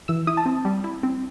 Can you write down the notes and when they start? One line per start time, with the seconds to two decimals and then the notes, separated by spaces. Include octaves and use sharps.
0.08 E3 E6
0.27 E4 D#6
0.37 A5
0.46 C4
0.65 G3
0.84 E4
1.03 C4